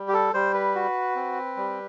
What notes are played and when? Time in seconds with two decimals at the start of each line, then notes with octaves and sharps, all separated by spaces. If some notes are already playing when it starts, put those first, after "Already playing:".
Already playing: G3
0.08 G4
0.13 A4
0.34 G3 C5
0.54 B4
0.75 F#4
1.16 C4
1.57 G3